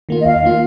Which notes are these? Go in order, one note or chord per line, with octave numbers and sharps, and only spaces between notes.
D#3 A#3 F4
D#5
D#2 F5
D#3 A#3 F4